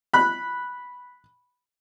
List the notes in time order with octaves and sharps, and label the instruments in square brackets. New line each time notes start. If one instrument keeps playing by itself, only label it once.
[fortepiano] B5 F#6